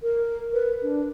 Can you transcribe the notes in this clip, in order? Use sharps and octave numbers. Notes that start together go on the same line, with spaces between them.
A#4
B4
D4